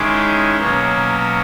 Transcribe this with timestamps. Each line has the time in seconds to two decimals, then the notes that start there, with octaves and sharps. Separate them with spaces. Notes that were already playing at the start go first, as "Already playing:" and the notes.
Already playing: D#3 G#3 C#4 E4 C6 D6
0.57 B2 F#3 A#3 C#4